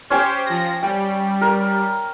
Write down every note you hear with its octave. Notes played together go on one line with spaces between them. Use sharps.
C#4 G4 C5 C#5 G5
F3 A#6
G3 G5
A#4